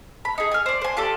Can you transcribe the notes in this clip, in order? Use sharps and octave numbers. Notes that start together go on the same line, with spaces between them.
B5
D#4 G#4
G#5 F6
C5 D5
C5 G#5
F4 G4 A4 D5